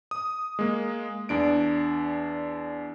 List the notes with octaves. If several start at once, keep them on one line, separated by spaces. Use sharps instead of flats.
D#6
G#3 A#3
E2 D4 D7